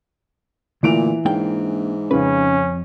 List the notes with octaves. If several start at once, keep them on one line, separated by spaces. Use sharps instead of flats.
A#2 D3 E3 A3 D7 F7
G#2 A#3 D4 G5
F2 C#3 C#4 B4